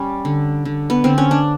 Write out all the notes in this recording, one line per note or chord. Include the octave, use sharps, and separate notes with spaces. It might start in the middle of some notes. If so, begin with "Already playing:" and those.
Already playing: G3 C#4
D3
D3
B3
D3 C4
C#4
D4